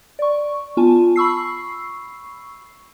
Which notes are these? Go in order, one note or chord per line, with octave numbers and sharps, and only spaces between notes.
D5 C#6
B3 F4 G#5 A5
B5 C#6 E6 C7